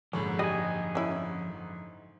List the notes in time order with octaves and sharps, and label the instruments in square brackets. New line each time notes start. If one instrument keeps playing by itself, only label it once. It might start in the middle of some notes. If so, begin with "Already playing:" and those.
[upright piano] F#1 G#2 D3 [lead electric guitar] F3 B5 [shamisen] C#4
[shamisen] G3 [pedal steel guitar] D#5 G#5
[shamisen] C#4 E4